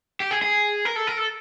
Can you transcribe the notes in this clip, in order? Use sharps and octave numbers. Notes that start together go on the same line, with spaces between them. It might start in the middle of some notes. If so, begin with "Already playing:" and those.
G4
G#4
G#4
A#4
A4
A#4
A4